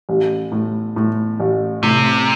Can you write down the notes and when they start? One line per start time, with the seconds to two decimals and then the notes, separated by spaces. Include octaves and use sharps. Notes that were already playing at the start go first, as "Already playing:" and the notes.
0.09 A1
0.52 A2
0.96 A2
1.40 A1
1.83 A2 C3